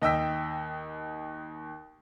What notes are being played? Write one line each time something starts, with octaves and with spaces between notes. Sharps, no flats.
D#2 D#5 G5 E6 B6